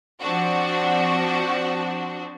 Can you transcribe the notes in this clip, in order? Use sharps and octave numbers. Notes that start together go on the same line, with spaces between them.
F3 C4 D4 F#4